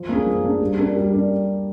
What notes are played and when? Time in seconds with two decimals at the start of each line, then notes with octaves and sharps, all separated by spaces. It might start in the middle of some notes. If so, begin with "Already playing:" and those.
Already playing: F3
0.09 A#3 D4 G#4
0.26 F3
0.44 A#3 D4 G#4
0.60 G3
0.78 D4 G4 A#4 D5
0.96 G3
1.13 D4 G4 A#4 D5